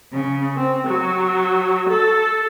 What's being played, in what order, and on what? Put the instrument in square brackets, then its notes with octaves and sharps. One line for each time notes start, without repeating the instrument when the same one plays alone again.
[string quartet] C#3
C4
F#3
A4